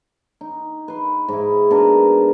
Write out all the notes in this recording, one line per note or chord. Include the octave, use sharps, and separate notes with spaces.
D#4
B4 C6
G#2 E4
B2 D4 A#4 A#5